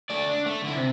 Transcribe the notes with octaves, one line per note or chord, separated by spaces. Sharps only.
A3 D5
D4
A3
D3 E4
C3